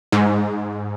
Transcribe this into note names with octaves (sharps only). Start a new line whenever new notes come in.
G#2